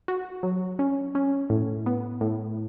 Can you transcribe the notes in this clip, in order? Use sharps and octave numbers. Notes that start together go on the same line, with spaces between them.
F#4
F#3
C#4
C#4
A2
B3
A2